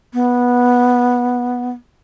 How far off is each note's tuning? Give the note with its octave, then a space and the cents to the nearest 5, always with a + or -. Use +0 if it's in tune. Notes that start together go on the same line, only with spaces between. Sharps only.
B3 -10